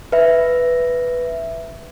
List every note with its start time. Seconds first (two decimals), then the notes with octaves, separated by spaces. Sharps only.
0.12 B4 E5